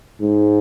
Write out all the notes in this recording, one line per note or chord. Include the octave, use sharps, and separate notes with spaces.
G#2